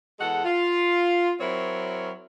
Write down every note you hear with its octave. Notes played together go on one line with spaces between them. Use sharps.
E2 G#3 A4 F#5
F4
F#3 C4 E4 A#4 C#5